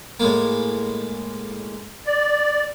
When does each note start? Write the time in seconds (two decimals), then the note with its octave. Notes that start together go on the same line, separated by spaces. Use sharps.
0.20 A2 G#3 A#3
2.06 D5